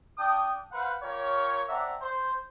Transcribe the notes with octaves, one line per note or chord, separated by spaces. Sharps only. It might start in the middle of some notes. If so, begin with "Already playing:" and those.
D4 G5 D#6
B4 C5 F5 F#5
F4 G4 A#4 C#5
C4 D4 D5 E5 F#5 A#5
C5